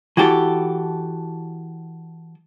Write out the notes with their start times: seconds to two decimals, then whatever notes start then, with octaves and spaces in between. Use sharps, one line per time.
0.17 E3 F#4 G4 A4